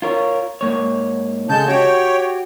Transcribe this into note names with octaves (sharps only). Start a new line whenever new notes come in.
F4 A#4 C#5
G#2 A#3 C#5
C#3 G#3 A4 A5 G6
F#4 G4 C#5 G5